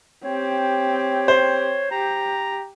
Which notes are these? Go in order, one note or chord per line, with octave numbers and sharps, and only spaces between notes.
C4 G4 C#5
C5
G4 A#5